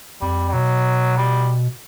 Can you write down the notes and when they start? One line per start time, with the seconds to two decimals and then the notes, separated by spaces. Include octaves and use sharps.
0.22 F2 G3
0.49 G3
0.53 B2 F#3
1.17 G3